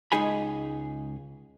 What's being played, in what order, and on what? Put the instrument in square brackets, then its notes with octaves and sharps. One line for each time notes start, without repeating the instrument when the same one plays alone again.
[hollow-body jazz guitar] C#2 G#3 D#4 G#4 G#5 B5